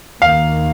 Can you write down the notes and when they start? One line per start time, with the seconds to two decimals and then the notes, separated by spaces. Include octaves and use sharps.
0.21 D#2 D#3 A#3 F5